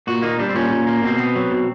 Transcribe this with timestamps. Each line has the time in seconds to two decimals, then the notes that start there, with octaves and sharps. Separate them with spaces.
0.07 A#2 F#4
0.22 A#3 D#4
0.39 G3 D4
0.49 C4
0.55 A#2 C#4
0.70 A#2
0.87 A#3
1.03 B2 C4
1.19 B3
1.35 F#3
1.52 B2